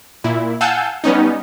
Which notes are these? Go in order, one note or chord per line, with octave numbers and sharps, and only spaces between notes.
A#2 E4
F5 F#5 G#5 A5 E6 G6
G3 B3 C#4 D#4